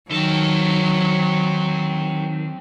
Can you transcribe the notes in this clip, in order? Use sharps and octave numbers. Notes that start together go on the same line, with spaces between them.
D#3 F#3 C4 A4